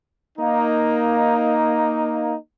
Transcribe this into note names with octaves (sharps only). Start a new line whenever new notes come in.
A#3 D#4